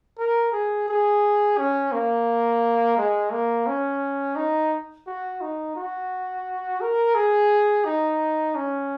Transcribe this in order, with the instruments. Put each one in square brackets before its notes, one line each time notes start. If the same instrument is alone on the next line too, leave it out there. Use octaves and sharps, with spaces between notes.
[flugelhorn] A#4
G#4
G#4
C#4
A#3
G#3
A#3
C#4
D#4
F#4
D#4
F#4
A#4
G#4
D#4
C#4